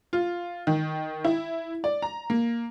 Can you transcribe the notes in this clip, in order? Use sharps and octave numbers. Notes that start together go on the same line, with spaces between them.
F4
D#3
E4
D5
A#5
A#3